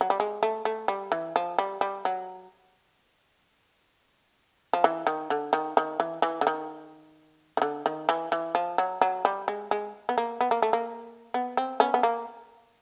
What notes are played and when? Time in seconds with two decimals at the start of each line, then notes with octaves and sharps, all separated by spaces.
0.01 F#3
0.10 G3
0.20 G#3
0.43 A3
0.65 A3
0.88 G3
1.12 E3
1.36 F3
1.59 G3
1.81 G3
2.05 F#3
4.73 F3
4.84 E3
5.07 D#3
5.30 D3
5.53 D#3
5.77 D#3
6.00 E3
6.22 E3
6.41 D3
6.47 D#3
7.57 D#3
7.62 D3
7.86 D#3
8.09 E3
8.32 E3
8.55 F3
8.78 F#3
9.01 F#3
9.25 G3
9.48 G#3
9.71 G#3
10.09 B3
10.18 A#3
10.41 B3
10.51 A#3
10.62 A3
10.73 A#3
11.34 B3
11.57 C4
11.80 B3 C#4
11.94 B3
12.03 A#3